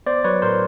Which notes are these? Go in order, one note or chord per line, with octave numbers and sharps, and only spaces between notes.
B3 C5 D5
F#3 B4 C#5
A2 A#4 C5